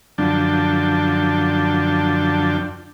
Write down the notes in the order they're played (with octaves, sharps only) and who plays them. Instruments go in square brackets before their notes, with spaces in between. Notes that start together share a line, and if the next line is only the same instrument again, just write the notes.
[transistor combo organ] F#2 D3 F3 D4 G5 A5